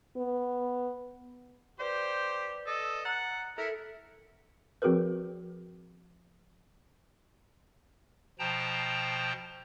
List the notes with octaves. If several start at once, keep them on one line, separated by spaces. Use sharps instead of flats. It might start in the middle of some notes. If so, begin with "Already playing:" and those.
B3
G4 B4 C5 D5
A4 D#5
F#5 A#5 F#6 A6
E4 A4 A#4 A#5 C#7
F3 C4 F#4 G#4 A#4 B4
B2 F3 C5 G5 A5 A#5